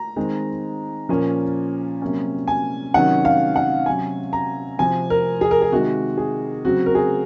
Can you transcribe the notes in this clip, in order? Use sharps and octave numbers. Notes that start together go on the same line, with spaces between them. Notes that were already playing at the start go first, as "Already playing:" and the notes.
Already playing: A#5
D#3 G#3 C4
A#2 F3 A#3 C#4
C3 F#3 A#3 C#4
G#5
C3 D#3 F#3 C#4 F#5
F5
F#5
C3 F#3 C#4 G#5
A#5
C3 F3 C4 G#5
A#4
G#4
A#4
G#4
C3 D#3 G#3 F#4
G#4
C#3 F#3 C4 F#4
A#4
G#4